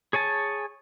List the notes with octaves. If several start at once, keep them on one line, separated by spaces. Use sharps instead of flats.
G#4 C#5 G#5 A5